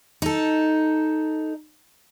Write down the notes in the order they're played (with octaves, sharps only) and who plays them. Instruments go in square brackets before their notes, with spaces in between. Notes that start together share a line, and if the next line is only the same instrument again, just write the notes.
[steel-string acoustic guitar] D#4 A4